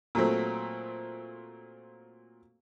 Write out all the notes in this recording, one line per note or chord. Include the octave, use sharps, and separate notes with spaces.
A#2 F#3 A3 C4